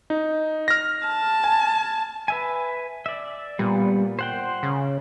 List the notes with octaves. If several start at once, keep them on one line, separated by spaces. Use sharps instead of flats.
D#4
F6 A#6
A5
G#5
B4 E5 G#5
D5 E5
A#2 G3 B3
C5 F#5 G5
C#3